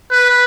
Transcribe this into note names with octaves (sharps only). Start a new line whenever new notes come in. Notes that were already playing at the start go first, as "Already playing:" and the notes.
B4